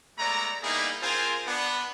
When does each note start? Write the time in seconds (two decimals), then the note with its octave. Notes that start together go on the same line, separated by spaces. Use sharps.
0.18 G#3 A3 B3 D5 A#5
0.63 G3 A#3 B3 D#4 E4 G#4
1.03 C4 F4 G#4 A#4 C5 G#5
1.47 B3 D4